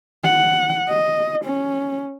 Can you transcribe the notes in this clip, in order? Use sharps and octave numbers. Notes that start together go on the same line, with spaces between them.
F#5
D#5
C#4